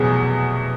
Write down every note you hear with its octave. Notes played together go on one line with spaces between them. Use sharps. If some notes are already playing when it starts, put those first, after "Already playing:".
Already playing: F1 E2 B2 F#3 G#4